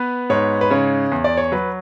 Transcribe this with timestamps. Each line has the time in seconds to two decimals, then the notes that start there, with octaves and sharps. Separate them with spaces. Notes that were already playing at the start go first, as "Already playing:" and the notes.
Already playing: B3 B4
0.30 G#2 C#5
0.61 B4
0.70 C#3 C#5
1.12 E2
1.24 D5
1.37 C#5
1.52 F#3 B4